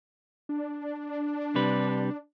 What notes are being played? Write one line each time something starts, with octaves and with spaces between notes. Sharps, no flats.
D4
C3 G3 B4